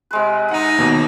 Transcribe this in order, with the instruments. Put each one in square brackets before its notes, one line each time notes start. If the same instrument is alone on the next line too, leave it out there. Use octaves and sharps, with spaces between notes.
[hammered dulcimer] C3 G#3 B4
[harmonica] D#4 [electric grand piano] F#5 D#7
[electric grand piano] D#2 B2 [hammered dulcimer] A#3 A#5